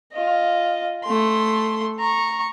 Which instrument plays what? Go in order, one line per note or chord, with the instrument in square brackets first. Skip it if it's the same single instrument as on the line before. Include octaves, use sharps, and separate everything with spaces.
[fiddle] F4 D#5
A3 C6
A#5 C#6